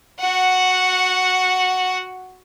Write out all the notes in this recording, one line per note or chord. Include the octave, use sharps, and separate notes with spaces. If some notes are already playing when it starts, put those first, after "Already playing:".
F#4 F#5